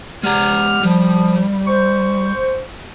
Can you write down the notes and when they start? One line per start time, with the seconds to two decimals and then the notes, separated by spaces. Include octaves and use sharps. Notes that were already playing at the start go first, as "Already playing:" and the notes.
0.23 G#3 G4 D5 F#5 A#5 F6
0.83 F3 G3
1.66 C5 C#6